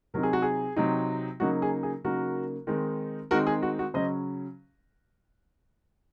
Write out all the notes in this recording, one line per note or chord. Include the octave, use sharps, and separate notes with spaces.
C3 F#3 C4 D#4 A#4
G#4
F#4
G#4
C3 F#3 C4 D#4
C#3 F#3 A#3 D#4 F#4
G#4
G#4
C#3 F#3 A#3 D#4 F#4 A#4
D#3 G#3 C4 D#4
D#3 G#3 C4 D#4 F#4 A#4
G#4
F#4
F#4
C#3 F#3 C#4 C5 D#5